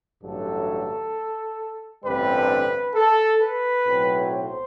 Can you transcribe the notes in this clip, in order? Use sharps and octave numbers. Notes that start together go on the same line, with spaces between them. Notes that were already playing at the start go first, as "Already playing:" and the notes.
A1 G2 D3 F#3 A3 A4
A1 G2 D3 G3 C4 B4
A4
B4
B1 A2 F#3 C4
C5